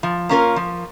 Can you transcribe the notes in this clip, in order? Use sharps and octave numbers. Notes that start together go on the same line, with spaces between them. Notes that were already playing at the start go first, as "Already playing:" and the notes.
F3
A#3 C#4 F4 A#4
F3